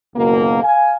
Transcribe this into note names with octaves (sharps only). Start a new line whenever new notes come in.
F#1 C#2 B2 A#3
F5 G#5